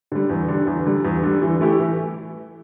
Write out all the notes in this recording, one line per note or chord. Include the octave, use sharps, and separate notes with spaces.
D3 G3
E2
D3 G3
E2
D3 G3
E2
D3 G3
E3
A3 E4 G4
E3